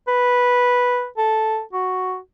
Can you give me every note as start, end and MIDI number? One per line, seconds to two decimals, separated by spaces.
0.08 1.07 71
1.18 1.62 69
1.73 2.18 66